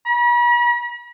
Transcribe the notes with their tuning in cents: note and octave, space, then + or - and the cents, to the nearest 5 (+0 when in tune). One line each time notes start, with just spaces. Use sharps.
B5 -45